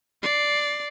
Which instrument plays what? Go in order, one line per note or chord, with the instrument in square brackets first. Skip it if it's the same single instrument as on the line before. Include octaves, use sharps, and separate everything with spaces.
[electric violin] D5 C7